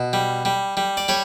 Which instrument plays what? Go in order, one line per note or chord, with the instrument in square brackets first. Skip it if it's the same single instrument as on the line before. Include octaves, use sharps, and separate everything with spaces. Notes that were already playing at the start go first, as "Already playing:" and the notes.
Already playing: [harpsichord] B2
G3
G3
G3
D5
G3 C#5